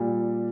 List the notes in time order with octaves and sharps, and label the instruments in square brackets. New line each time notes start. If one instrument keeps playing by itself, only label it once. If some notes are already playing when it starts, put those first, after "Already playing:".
Already playing: [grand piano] A#2 G3